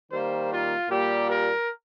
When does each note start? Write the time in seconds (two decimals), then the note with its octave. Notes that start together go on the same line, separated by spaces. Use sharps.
0.12 D#3 G3 A#3 C5
0.51 F4
0.88 A#2 G3 A#3 G4
1.28 A#4